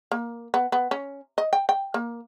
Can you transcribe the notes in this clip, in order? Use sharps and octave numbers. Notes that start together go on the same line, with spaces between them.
A#3
B3
B3
C#4
D#5
G5
G5
A#3